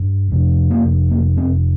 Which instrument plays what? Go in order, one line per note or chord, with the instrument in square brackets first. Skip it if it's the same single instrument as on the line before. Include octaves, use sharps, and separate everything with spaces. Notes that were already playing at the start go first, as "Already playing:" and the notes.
Already playing: [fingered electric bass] G2
F2 C3
A#3
A#3
C4